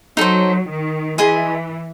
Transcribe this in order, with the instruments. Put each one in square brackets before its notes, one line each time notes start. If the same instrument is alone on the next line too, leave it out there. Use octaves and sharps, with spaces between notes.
[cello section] F#3 [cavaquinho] D#4 A4 C5
[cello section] D#3
[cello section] E3 [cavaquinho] G#4 D#5 G#5 C6